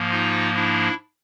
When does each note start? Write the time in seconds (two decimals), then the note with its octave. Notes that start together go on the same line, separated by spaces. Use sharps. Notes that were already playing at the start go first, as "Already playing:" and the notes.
Already playing: G#2 F3 A#3
0.11 D#4 F4
0.55 D4 E4